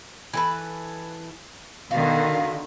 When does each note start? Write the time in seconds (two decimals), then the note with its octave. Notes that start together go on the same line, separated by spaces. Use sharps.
0.33 E3 A4 B4
1.91 B2 D3 D#3 F#4 F5